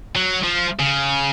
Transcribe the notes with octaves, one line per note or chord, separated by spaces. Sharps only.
F#3
F3
C#3